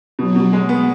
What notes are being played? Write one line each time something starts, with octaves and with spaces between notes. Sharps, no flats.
B2 F#3
B2
G#3
B3